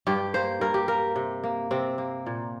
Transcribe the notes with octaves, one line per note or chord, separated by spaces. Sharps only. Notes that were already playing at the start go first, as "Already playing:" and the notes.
G2 G4
A#3 C5
G2 A#4
G4
A#3 A#4
C3
A#3
C3 C4
A#3
A#2